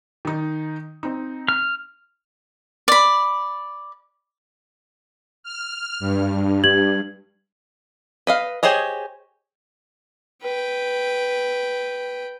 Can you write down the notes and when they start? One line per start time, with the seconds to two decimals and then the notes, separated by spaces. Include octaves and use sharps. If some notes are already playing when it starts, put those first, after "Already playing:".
0.25 D#3 D#4
1.03 C4 D#4
1.49 F6
2.88 D5 B5
5.43 F6
6.00 G2
6.64 G4 G#6 F#7
8.27 B4 D#5 F5
8.63 G4 G#4 C5 C#5 D#5
10.43 B4 G5